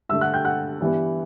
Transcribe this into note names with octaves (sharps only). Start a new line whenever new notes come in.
G2 D3 A3 E5 E6
F#5 F#6
G5 G6
F#5 F#6
G2 E3 G3 B3